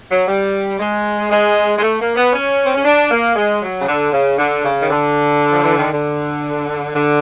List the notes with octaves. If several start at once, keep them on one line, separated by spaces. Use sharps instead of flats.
F#3
G3
G#3
G#3
G#3
A3
A#3
B3
C#4
C4
C#4
D4
A#3
G#3
F#3
C#3
D3
C#3
D3
C#3
D#3
D3
F3
E3
D#3
D3
D3